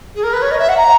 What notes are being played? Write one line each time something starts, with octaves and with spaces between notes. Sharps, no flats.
G#4
A#4
B4
C#5
D#5
E5
F#5
A#5